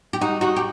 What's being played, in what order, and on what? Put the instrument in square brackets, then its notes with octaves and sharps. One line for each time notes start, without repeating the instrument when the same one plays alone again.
[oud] G4
[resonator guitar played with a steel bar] D#4 [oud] F#4
[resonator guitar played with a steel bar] D#4 [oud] F#4
[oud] G4